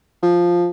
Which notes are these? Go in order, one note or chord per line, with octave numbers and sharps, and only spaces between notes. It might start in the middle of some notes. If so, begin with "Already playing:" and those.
F3